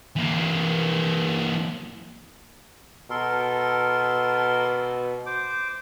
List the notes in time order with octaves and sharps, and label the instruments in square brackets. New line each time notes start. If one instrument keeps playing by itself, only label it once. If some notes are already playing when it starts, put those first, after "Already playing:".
[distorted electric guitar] E3 A#3
[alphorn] B2 [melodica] A4 A#4 C6
[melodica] C5 D6